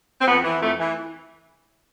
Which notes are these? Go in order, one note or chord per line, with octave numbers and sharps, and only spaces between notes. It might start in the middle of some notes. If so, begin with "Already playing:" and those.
C4
F2 B3
E3
F2 A3
E3